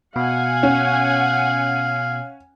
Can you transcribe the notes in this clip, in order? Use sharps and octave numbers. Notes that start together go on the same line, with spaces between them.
B2 F5 F#5 G#5
C#4